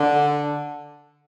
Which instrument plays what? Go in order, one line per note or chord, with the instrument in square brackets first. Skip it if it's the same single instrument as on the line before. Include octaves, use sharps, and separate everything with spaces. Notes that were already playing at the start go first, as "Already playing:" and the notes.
Already playing: [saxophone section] D3